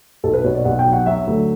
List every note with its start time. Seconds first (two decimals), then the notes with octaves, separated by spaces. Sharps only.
0.24 B1 A4
0.33 B4
0.44 B2 C#5
0.55 D5
0.65 B1 F#5
0.79 G5
0.86 F#3
0.93 F#5
1.06 F#3 E5
1.27 D2